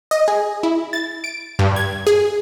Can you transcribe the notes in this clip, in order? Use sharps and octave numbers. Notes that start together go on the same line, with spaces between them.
D#5
G#4
E4
A6
D7
G2
G#6
G#4